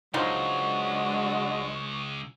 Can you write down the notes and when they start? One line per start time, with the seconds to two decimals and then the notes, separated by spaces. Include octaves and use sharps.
0.14 C#2 F3 F#3 G#3 D4 D#4 C6 C#6